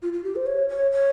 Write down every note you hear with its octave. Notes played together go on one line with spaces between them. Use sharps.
F4
F4
G4
C5
C#5
C#5
C#5